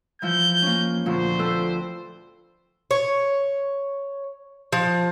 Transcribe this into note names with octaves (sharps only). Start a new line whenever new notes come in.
E3 F3 G6
A#3 C#4
D2 A#2 F3 C5
C4 A4 B4
C#5
F3